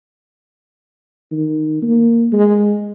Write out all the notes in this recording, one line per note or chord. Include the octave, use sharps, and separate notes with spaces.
D#3
A#3
G#3